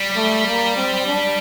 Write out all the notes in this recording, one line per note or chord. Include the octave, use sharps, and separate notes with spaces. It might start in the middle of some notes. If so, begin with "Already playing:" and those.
Already playing: G3
A3
A#3
C4
D4